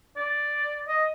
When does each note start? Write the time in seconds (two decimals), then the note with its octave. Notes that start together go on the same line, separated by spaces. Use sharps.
0.17 D5
0.88 D#5